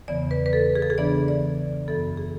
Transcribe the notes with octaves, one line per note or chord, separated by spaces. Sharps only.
E2 C#3 E3 B3 D5
B4
B4
A4
G#4
A4
G#4
C#3 E3 B3 D4 D5
D5
F#2 E3 B3 A4
G#4